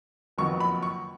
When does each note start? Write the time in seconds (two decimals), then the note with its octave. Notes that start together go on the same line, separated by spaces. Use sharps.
0.38 F#1 F2 D#3 F#3 B3 C#6
0.60 B5
0.83 C#6